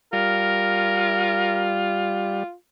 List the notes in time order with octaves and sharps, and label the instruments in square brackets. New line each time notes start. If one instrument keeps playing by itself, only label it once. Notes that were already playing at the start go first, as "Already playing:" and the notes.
[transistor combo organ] G3 [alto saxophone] F4 [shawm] A#4